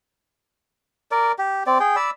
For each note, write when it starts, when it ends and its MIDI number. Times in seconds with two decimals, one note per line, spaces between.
1.11 1.32 70
1.11 1.32 74
1.38 1.63 67
1.67 1.78 60
1.67 1.78 74
1.80 1.96 68
1.80 1.96 79
1.96 2.10 74
1.96 2.10 83
1.96 2.10 88